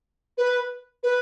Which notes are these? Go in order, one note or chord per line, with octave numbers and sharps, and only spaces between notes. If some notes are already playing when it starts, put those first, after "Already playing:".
B4
B4